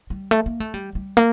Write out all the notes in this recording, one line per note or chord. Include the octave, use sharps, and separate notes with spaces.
G3
A3
A#3
A3
G3
G3
A#3